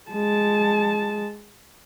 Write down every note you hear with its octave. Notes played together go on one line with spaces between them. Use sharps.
G#3 A5